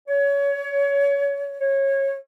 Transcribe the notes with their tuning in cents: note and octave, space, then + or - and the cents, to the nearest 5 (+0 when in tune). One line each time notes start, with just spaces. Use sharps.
C#5 +25
C#5 -20